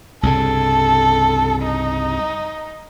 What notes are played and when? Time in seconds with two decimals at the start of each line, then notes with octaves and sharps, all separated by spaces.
0.23 C2 G2 C#3 A4
1.62 D#4